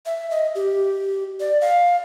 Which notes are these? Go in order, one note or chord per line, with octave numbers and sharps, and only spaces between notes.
E5
D#5
G4
D5
F5